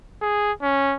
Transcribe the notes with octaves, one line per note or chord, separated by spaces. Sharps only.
G#4
C#4